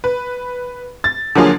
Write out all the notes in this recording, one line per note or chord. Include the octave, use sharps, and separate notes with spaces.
B4
A6
D3 F3 F#3 A#3 F4 G#4